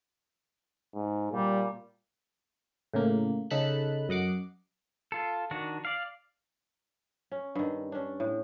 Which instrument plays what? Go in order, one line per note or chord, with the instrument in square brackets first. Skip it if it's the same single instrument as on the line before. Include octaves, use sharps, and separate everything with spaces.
[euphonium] G#2
[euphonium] A#2 [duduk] G3
[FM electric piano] A2 C#3 A#3
C#3 D#4 A4 A5 B5 F#6
F#2 D#5 F#5 D6 C7
[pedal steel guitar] F4 A4
D#3 D4 F#4
D5 F5
[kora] C#4
G2 D#3
C#4 D4
A2